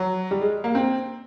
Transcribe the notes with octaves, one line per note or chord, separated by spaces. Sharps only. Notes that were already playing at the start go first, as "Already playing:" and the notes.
Already playing: F#3
G3
G#3
A#3
C4